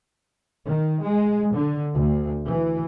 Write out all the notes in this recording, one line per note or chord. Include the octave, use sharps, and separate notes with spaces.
D#3
G#3
D3
D2
E3